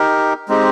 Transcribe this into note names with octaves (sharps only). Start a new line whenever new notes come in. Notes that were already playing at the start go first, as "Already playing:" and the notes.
Already playing: D#4 G4 A#4
G#3 C4 D#4 G4